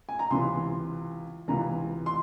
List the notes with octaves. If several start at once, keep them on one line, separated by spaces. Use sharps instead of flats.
G#5
A#5
C#2 C3 E3 C6
C#2 C3 E3 A#5
C6